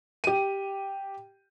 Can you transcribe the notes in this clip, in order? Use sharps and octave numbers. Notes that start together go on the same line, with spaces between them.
G4 D#7